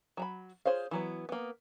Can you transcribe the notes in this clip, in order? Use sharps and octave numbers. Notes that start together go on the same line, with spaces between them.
F#3 A#5 B5
F4 G#4 C5 C#5 F5
E3 F#3 B3
A#3 B3